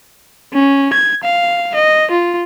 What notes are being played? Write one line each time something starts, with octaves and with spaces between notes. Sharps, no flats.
C#4
G#6
F5
D#5
F4